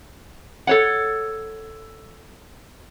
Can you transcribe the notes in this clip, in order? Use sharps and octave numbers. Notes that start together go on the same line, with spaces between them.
A4 C#5 F#5